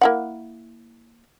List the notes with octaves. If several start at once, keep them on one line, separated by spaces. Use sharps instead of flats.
A#3 E4 F#5